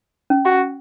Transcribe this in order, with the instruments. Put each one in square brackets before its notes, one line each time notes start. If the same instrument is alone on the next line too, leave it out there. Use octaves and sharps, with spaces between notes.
[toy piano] C#4
[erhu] F#4